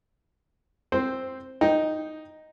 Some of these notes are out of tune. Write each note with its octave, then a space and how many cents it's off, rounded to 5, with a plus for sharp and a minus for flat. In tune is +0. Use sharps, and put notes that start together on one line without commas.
C4 +5 C5 +0
D#4 +0 G5 +0